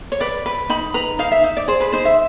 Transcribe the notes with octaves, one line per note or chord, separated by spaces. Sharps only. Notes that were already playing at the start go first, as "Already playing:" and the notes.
C#5
B4 D5
B4
D#4 B5
B4 A#5
D#4 F5
E5
D#4
D5
G#4 C5
B4
D#4 C5
E5